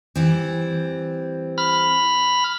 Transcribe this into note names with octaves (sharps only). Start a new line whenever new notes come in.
E3 G3 C4
B5 F6